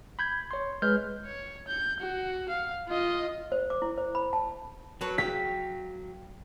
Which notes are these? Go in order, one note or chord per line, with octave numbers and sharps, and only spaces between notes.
B5 G6 G#6
C#5 C6
G#3 B4 F6 G6
C#5
G6
F#4
F5
F4 D#5
C5
D6
E4
C5
B5
A5
F#3 A4 B4 C#5
F5 G5 B6